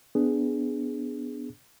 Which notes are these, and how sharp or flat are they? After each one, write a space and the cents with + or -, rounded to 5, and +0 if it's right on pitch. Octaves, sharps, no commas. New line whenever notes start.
B3 +15 D4 +0 G#4 +0